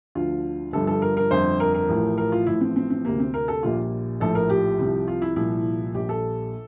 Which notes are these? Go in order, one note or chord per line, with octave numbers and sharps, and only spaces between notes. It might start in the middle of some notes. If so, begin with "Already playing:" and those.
D2 D3 F3 F4
G1 G2 F3 A4
A4
A#4
A#4
G1 F2 D3 C5
A#4
A#4
A1 A2 F3
A#4
F4
A1 A2 F3 E4
C4
C4
C4
D2 C3 G3 A#3
C4
A#4
A4
A#1 A#2 G3 F4
A#1 A2 F3 A4
A#4
G4
C2 C3 F3
F4
E4
C2 A#2 F3 E4
A#1 A#2 G3 G4
A4